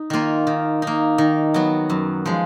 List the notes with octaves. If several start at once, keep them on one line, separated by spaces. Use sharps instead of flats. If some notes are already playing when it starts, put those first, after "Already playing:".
Already playing: D#4
D#3 A#3 F4
D#3
A#3 D#4
D#3
F#3 B3 F#4
F#2
F3 G#3